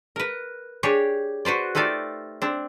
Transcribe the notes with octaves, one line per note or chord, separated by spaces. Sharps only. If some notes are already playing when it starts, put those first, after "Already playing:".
A#4 B4
D4 G4 G#4 C#5
F#4 B4 C5 D5
A3 D#4 F4 G4 A4 D5
C4 D4